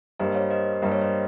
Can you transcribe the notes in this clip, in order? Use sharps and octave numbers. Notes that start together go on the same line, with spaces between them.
G2 G3 A#3 C5 D#5
C#5 F5
C5 D#5
G2 G3 A#3 D#5
C#5
C5 D#5